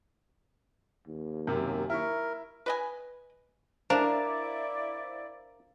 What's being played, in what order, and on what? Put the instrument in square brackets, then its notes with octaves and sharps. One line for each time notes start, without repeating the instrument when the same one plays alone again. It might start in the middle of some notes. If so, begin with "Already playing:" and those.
[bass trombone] D#2
[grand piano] F#2 C3 A#3
[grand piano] E4 C#6 [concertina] A#4
[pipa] B4 D#5 G#5
[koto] D4 [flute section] E4 D5 [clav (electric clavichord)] A#4 [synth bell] C5 F5